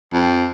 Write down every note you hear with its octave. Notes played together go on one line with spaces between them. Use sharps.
F2